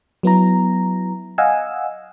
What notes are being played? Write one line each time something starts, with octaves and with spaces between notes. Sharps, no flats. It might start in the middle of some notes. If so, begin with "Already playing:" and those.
F#3 B3 E4 A#5
D#5 F5 F#5 G#5 E6